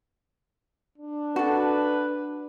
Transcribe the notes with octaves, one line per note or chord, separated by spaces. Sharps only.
D4
F#4 A4 B4